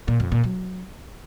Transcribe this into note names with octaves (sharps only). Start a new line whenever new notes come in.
A#2
F2
A#2
F#3